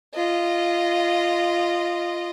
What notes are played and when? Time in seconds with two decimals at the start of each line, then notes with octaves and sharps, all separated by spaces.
0.15 F4 D#5